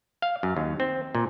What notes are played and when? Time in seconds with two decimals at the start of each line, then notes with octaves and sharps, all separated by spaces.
0.22 F5
0.43 F#2
0.56 D#2
0.80 C4
1.15 A#2